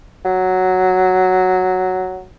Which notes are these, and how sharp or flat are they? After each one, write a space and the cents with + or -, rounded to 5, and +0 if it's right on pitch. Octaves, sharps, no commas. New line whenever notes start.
F#3 +0